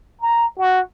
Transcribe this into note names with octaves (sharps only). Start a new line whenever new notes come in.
A#5
F#4